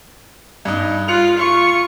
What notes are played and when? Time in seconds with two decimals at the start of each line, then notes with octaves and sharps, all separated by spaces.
0.65 G2 D#4
1.08 F4 F#6 C#7 F7
1.37 F4 C#6